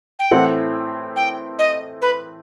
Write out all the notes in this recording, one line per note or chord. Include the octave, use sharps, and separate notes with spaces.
G5
A2 E3 A3 C4 F#5
G5
D#5
B4